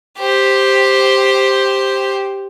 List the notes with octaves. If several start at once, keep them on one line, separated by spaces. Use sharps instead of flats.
G4 C5